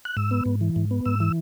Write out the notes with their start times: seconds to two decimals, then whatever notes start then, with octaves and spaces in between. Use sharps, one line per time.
0.05 F#6
0.17 G#2 E6
0.31 B3
0.46 G#2
0.61 E3
0.76 G#2
0.91 B3
1.05 G#2 E6
1.20 E3